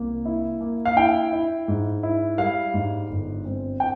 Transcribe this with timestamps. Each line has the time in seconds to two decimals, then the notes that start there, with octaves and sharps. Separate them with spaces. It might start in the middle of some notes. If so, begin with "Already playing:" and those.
Already playing: C2 A#3
0.25 E4
0.61 A#3
0.85 F5
0.96 E4 G5
1.33 E4
1.68 G#2
2.03 E4
2.38 G3 F5
2.74 G#2
3.10 G1
3.45 C4
3.80 G5